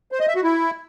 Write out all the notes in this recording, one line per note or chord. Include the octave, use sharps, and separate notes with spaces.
C5
D#5
E5
F#4
E4